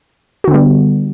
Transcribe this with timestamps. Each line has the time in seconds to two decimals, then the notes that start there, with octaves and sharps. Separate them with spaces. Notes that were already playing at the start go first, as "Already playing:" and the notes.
0.44 F#4
0.48 D3
0.51 B3
0.54 G3